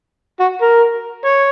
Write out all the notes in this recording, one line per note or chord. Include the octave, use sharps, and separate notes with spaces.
F#4
A#4
C#5